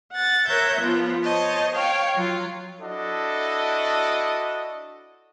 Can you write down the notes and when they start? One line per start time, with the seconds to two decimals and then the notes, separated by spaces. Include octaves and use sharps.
0.11 F#5 A6
0.48 A#4 C#5 E5 F#6 G6
0.79 F3 B3 F4
1.23 C5 C#5 D#5 A5
1.74 C#5 F5 G5
2.15 F#3 F4
2.81 D4 E4 F#4 A4 D#5